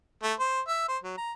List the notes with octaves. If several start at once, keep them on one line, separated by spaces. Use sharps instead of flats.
A3
C5
E5
C5
F#3
A#5